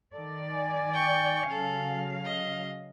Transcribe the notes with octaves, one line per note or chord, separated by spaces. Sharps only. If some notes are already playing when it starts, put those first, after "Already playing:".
D#3 A4 D5
G#5
G5 C#6
C#3 F#3 A4 F5
D#5